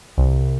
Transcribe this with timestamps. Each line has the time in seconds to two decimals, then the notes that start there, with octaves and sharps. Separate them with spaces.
0.17 C2